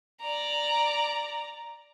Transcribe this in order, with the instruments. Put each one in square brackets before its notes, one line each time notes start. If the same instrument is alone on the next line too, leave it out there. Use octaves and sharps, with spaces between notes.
[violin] D5 A#5